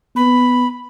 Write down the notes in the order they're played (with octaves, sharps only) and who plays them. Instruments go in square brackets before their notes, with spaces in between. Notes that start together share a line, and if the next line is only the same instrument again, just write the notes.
[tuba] B3 [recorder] B5